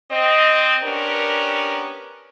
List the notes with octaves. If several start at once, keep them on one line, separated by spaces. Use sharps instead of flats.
C4 D#5
B3 C#4 D4 G4 A#4